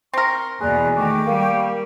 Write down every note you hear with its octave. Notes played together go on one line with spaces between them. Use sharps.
C4 A#4 C6 C#6
E2 B2 G#4 D5 A#5 F#6
D#3 A3 G5 C#6 D6
G3 A#3